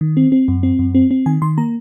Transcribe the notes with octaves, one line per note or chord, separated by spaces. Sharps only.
D#3
C4
C4
F#2
C4
F#2
C4
C4
D#3 G#5
D#3 C6
A#3 A#5